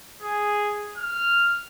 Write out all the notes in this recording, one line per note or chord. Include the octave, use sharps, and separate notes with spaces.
G#4
F6